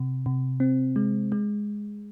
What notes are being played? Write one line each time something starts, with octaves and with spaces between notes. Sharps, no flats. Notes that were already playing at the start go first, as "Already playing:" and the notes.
Already playing: C3
C3
C4
G#3
G#3